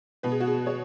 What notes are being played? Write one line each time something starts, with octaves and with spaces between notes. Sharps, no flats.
B2 B4
G#4
F#4
G#4
G#4 C#5